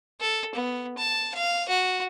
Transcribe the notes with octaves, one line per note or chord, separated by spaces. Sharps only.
A4
B3
A5
F5
F#4